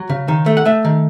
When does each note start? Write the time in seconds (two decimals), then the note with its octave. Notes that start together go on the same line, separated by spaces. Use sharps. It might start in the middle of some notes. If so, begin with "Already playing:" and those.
Already playing: F#3
0.09 C#3
0.28 D#3
0.46 A3
0.57 F#5
0.65 A3 E5
0.85 D#3